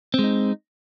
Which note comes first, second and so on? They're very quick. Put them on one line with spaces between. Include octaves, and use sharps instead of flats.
C4 G#3 D#4